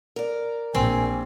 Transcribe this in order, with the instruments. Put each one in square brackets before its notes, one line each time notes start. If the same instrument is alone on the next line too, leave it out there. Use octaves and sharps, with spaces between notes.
[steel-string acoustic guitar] A#4 D5
[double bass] A#1 [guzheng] C4 [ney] G#5